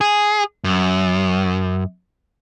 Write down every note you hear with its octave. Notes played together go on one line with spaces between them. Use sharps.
G#4
F#2